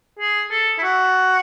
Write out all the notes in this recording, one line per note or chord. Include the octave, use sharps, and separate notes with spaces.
G#4
A4
E4
F#4